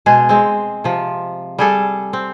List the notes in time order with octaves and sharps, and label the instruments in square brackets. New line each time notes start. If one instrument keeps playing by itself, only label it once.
[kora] B2 G#3 G#4
G#3 C4
C3 F3
G3 G#4 A4
C4